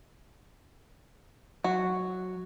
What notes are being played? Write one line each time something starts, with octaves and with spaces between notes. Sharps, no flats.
F#3 F#4